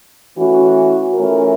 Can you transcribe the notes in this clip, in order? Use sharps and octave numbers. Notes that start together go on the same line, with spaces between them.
E3 A3 C#4 F#4
E3 A3 C#4 F4 A#4